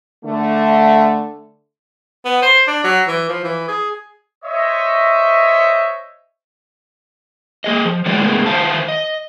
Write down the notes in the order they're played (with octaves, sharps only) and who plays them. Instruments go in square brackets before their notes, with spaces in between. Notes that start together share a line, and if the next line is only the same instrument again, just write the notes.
[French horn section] D3 A3
[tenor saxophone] B3
C5
D4
F#3
E3
F3
E3
G#4
[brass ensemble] C5 C#5 D#5 E5
[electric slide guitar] A#3 G#4 D#5
F3
D#3 E3 F#3 G#3 E4 D5
A2 C#3 G#3 A#3 B3 G#4
D#3 C5 E5 F5 A5
D#5